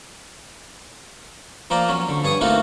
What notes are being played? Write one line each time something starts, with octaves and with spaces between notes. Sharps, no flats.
F3 A#3 A#4 C5 D5
F#3 C#4
D3
G2 G#4 C#5 C#6 D#6
A3 A#3 C4 D#4 F4 F#4